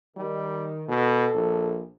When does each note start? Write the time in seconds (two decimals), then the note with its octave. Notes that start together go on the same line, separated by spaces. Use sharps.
0.17 D#3 G3
0.89 B2 A4
1.34 A#1